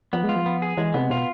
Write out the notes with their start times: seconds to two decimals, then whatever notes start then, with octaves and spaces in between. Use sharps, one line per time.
0.13 F3 B3
0.24 G#3
0.29 F4
0.36 F3
0.46 B3
0.62 G#4
0.77 E3 G#3
0.94 C3 B3
1.10 B2 F4